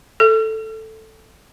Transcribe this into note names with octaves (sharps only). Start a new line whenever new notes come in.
A4